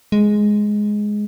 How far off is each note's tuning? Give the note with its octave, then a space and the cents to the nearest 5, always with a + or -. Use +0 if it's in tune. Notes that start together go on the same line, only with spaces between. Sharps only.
G#3 +5